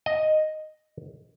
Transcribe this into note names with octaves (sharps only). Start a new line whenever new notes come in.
D#5